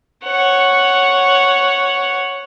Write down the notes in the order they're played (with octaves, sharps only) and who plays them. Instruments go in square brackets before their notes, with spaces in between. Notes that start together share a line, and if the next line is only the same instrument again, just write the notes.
[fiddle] C#5 F#5